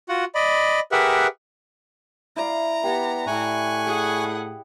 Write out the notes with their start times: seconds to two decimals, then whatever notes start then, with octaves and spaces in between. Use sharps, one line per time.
0.09 F4 F#4 F#5
0.35 D5 D#5 B5
0.92 G4 G#4 A#4 B4 E5 F#5
2.36 E4 D5 F5 A#5
2.84 B3 G4
3.27 A2 E4 G#5 C#6 F#6
3.86 G#4 F#5